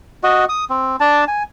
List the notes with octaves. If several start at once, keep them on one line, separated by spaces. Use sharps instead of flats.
F#4 D#5
D#6
C4
D4 A5
G#5